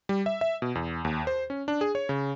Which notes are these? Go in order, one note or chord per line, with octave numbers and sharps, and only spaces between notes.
G3
E5
E5
B2
E2
D#2
C5
C#4
D4
G#4
C#5
C#3